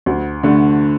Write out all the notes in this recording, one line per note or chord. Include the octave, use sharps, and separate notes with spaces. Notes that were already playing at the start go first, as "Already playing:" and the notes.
D2
D3 A3